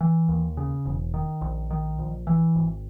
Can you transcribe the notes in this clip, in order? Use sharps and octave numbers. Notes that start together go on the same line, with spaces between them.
E3
D#2
C#3
E1
D#3
A#1
D#3
A#1
E3
G#1